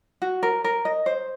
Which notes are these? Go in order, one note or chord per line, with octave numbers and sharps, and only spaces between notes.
F#4
A#4
A#4
D#5
C5